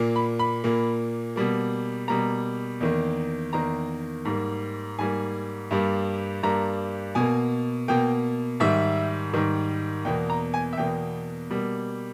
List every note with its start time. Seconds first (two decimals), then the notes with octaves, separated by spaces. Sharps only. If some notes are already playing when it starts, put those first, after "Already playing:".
Already playing: A#2 A#3
0.16 B5
0.39 B5
0.64 A#2 A#3
1.36 B2 G3 A#3
2.08 B2 G3 A#3 A#5
2.80 E2 D#3 A#3
3.53 E2 D#3 A#3 A#5
4.25 G#2 G3 A#3
4.98 G#2 G3 A#3 G#5
5.71 G2 G3 A#3
6.43 G2 G3 A#3 A#5
7.15 B2 A#3 G#5
7.88 B2 A#3 G5
8.60 G#2 D#3 G3 E5
9.33 G#2 D#3 G3
10.05 E2 B2 A#3 G5
10.30 A#5
10.54 G#5
10.73 E5
10.77 E2 B2 A#3 G5
11.50 B2 G3 A#3